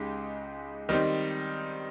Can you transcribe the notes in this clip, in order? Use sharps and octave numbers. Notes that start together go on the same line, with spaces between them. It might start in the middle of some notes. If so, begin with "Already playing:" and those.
Already playing: C#2 C#3 G#3 D#4 G4
D#3 G3 C4 D#4